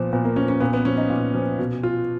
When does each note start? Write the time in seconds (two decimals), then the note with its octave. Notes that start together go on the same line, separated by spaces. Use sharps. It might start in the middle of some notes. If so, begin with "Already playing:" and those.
Already playing: A#2 F3 B3
0.13 A#2 B3
0.25 A#3
0.36 F3 C#4
0.48 C#4
0.60 A#2 B3
0.73 B3
0.85 F3 C#4
0.98 D#4
1.10 A#2
1.34 F3
1.59 B2
1.83 F4